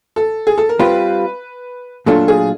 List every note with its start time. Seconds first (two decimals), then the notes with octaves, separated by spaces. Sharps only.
0.16 A4
0.47 G#4
0.58 A4
0.69 A#4
0.79 G3 C4 F4 B4
2.06 A#2 F#3 A3 D4 F4 A4
2.28 G#4